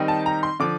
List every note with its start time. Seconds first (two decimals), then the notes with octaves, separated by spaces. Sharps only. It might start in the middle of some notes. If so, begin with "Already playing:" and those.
Already playing: D#3 G3 C4 D#4
0.08 A5
0.26 A#5
0.43 C6
0.60 D3 F3 D6